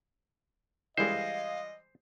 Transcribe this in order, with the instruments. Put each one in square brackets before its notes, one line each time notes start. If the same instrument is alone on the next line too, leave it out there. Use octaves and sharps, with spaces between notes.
[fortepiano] E3 G3 G#3 [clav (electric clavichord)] C5 [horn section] D#5 [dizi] F5